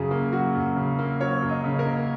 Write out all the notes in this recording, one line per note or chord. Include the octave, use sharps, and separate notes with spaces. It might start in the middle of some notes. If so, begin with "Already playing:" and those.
Already playing: F#2 C#3 F#3 G#4
A#3
F#3 F#4
F#2
C#3
A#3
F#3 C#5
F#2
D#5
C#3
A#4
A#3